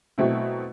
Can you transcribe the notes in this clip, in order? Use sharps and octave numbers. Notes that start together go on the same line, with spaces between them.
B2 F#3 A3 C4 E4